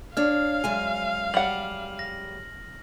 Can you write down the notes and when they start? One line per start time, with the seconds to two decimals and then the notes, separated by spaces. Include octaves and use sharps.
0.17 D4 C#5 F5 F6
0.64 F#2 G#3 G#5
1.34 G3 F#5 F#7
1.99 A#6